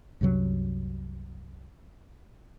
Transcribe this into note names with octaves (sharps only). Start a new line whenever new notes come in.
C2 F#2 C3 F#3